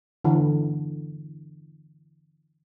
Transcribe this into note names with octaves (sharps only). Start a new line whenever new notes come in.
D3 E3